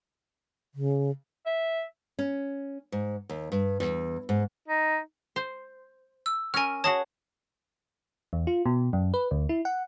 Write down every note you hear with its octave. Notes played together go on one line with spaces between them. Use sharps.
C#3
E5
C#4
G#2
D#2
G2
E2
G#2
D#4
C5
E6
C#4 A#4 G#5 F6
F#4 G#4 C#5 D#5 A5
E2
F4
B2
F#2
B4
D2
E4
F#5